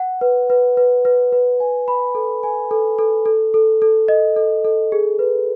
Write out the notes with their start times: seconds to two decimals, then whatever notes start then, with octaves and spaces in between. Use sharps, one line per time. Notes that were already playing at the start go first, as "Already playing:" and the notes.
Already playing: F#5
0.21 B4
0.50 B4
0.77 B4
1.05 B4
1.32 B4
1.60 G#5
1.88 B5
2.15 A4
2.43 G#5
2.71 A4
2.99 A4
3.26 A4
3.54 A4
3.82 A4
4.08 D#5
4.36 A4
4.65 A4
4.92 G#4
5.19 B4